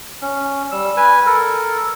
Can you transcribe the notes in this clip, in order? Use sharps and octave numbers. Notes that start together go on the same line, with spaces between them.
C#4
G3 E6
B4 G#5
A4 A#4